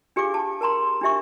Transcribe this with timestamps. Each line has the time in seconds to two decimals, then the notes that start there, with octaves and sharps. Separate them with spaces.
0.16 D4 G4 G#4 F5 D6
0.34 A5
0.61 A#4 A5 A#5 C6
1.01 D4 D#4 G4 E5 C#6